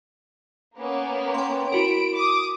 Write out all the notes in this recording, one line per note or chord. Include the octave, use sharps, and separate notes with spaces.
A#3 B3 C#4
G5 C6
E4 F#4 A#4 B5 D7
D6 D#6